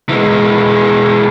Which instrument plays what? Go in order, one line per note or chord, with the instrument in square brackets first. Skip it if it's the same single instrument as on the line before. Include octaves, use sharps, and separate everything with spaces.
[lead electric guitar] E3 G#3